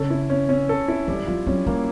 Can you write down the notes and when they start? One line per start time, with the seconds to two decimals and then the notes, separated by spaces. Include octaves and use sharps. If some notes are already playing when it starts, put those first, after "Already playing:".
Already playing: C#3 C#4 A4
0.10 E4
0.30 C#4
0.49 C#4
0.69 A4
0.88 E4
1.08 E3 G3
1.27 F3 F4
1.46 F#3 C#4
1.66 G3 A#3